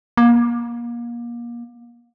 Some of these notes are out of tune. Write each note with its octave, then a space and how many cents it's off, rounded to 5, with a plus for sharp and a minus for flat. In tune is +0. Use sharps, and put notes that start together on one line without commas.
A#3 +30